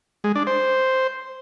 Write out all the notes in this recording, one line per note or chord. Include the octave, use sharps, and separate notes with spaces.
G#3
D4
C5